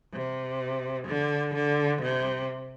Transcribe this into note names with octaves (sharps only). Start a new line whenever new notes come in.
C3
D3
D3
C3